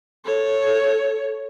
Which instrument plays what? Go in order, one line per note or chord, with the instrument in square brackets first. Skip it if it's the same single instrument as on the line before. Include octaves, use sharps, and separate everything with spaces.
[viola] A4 C#5